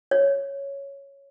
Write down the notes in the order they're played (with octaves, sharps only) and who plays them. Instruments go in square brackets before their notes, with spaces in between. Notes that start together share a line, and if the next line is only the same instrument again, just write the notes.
[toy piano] C#5